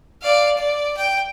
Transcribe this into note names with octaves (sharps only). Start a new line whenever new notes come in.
D5 F5
D5
G5